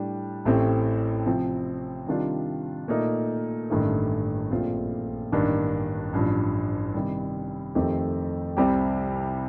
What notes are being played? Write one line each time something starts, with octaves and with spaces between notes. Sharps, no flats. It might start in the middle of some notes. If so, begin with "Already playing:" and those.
Already playing: A2 G3 D4
A1 A2 A3 C4 G4
C3 F3 C4
C3 D#3 G3 D4 F4
A#2 A3 D#4 A#4
A1 G2 D#3 A3
A#1 A#2 A3 C4 F4
A1 G2 D#3 A#3 D4
A1 G2 F3
C3 D#3 G3
F2 D#3 A3 C4 G4
C2 C3 G3 C4 G4